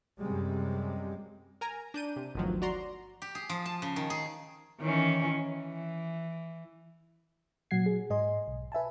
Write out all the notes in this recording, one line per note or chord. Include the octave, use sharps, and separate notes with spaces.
F#2 C3 G3 G#3
A#4 G#5 A#5
D4 G6 D#7
C3
G1 D2 D#3 F3 F#3
F#4 D5 A#5 C6
G4
G#4
F3
A5
C#3
D#3
G#4
D#3 E3 C#4
E3
A#2 F#3 F#5 G#6 C7
G#4
G#2 D#5 G#5 C6
B1
B4 E5 G#5 A5